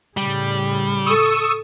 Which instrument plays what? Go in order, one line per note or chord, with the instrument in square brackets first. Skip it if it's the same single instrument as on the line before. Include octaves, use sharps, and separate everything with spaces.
[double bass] A2 C#3 [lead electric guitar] G3
[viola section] A4 [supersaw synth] C#6 D#6 E6